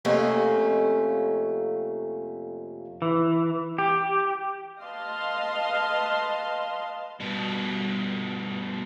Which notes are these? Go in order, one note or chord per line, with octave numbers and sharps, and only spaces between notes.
F2 C3 A3 A#3 C#4
E3
G4
B4 D#5 F5 A5 C6
G2 B2